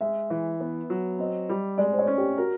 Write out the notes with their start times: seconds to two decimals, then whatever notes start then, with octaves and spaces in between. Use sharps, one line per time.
0.01 G#3 E5
0.30 E3
0.60 B3
0.90 F#3
1.19 C4 D#5
1.49 G3
1.78 G#3 D5
1.93 C5
1.99 C#5
2.07 C#4
2.18 G4
2.38 F#4 A#4